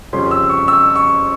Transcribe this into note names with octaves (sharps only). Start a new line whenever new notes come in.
F2 C#3 G3 C#4 C6
E6
C#6
E6
C#6